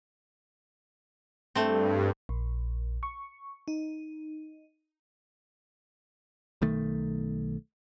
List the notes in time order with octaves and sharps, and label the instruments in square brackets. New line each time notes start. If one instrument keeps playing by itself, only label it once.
[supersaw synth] G2 [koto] A3 C4
[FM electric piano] A#1
C#6
D#4
[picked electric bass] B1 D#3 A3